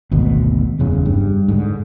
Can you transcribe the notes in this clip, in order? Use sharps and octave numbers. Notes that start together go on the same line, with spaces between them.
G#1 D2 B2
F#1 E2 C#3
G2
G#2 D3